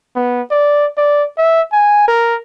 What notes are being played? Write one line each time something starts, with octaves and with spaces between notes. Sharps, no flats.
B3
D5
D5
E5
G#5
A#4